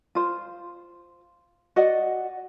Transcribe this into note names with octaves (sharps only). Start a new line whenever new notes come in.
F4 C5
F#4 D5 D#5 F#5